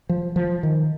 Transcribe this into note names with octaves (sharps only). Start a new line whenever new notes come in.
F3
F3
D#3